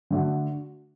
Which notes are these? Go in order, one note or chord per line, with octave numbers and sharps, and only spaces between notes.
D3 A3 D4 F#4